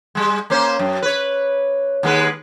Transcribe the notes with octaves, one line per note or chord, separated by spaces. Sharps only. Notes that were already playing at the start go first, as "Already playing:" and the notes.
G3 G#3
A#3 C#4 C5
F#2
B4 C#5
D#2 G#3 B4